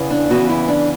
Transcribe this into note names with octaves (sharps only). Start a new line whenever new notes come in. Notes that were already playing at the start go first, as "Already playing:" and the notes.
Already playing: E2 C#3 E3 B3
D4
E2 C#3 E3 B3 F#4
E4
D4